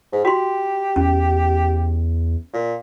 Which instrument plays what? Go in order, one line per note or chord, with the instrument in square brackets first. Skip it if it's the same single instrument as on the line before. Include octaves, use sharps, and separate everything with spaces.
[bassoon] G#2
[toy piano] F#4 C6 [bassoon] G4
[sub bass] E2 [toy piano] C#4
[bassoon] A#2